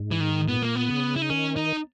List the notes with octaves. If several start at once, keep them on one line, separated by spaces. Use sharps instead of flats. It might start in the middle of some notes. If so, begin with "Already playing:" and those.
Already playing: G#2
E3
D#3
A#2 B3
A#3
B3
C#3
E4
D#4
D#3 C#4
D#4